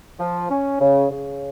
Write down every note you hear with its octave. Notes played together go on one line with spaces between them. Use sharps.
F3
C#4
C#3
C#3